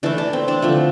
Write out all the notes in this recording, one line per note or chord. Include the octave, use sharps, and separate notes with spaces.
E3 A3 D4
D4
C4
D4
D3 F3 A3